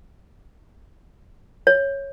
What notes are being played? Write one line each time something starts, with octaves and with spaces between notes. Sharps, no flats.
C#5